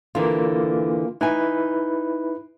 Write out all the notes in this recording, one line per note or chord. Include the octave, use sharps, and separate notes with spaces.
D3 E3 A#3 F4
D#4 E4 B4 G#5